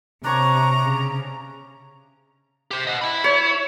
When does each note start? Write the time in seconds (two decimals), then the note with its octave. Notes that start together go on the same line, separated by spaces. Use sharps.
0.24 C3 D4 C#5 A#5 C#6
0.84 C#3
2.71 G4 C5
2.87 D#5 F#5
3.02 E4 B5
3.24 C#5